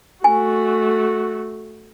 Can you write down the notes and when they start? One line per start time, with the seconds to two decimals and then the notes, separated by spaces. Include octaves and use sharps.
0.24 A3 F#4 G#5